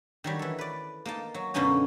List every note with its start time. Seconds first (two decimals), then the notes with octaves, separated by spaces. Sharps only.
0.24 D#3 F#3 G3
0.39 E3 A4
0.58 B4 D5
1.06 A#3 D#4 A5
1.34 F#3
1.54 F#2 B2 D3 A#3 C#4 D#4